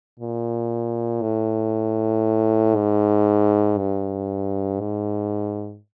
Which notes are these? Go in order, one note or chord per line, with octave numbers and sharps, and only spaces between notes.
A#2
A2
G#2
G2
G#2